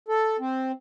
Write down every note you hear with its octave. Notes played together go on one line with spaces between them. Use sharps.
A4
C4